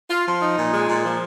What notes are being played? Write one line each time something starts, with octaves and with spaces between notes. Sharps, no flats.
F4
F3
D#4
A#2
G#3
A#2
F3